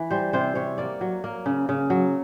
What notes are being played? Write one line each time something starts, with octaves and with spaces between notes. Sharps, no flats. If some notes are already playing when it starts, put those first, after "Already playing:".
Already playing: E3
G3 C5
C3 C5
C3 C#5
A#3 D5
F#3
A#3
C#3
C#3
F#3